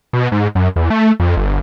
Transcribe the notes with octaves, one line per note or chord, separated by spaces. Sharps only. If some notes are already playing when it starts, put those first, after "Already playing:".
B2
G#2
F#2
E2
A3
F2
G1